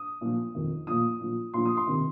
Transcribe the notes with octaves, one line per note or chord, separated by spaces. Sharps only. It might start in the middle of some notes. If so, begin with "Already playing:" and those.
Already playing: D#6
A#2 F3
F2 D#3
A#2 F3 D#6
A#2 F3
A#2 F3 C6
D#6
C6
C3 D#3